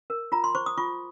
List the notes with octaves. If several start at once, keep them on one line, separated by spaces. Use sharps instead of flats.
A#4
F4 A#5
C6
C5 C#6
D#6
F4 C#6